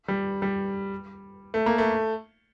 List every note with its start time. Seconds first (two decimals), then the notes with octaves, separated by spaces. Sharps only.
0.08 G3
0.42 G3
1.54 A3
1.66 A#3
1.78 A3